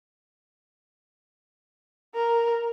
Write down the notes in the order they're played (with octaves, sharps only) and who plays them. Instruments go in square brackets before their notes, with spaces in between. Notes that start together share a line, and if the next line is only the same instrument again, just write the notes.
[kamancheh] A#4